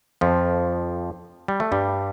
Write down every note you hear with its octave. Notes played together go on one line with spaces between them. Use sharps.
F2 F3
G3
A3
G2 G3